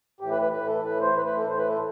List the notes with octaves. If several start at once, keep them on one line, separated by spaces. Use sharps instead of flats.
A2 E3 G4
B4
B4
A2 E3 B4
A4
A2 E3 B4
C5
A2 E3 B4
B4
A4
A2 E3 C5
B4
A4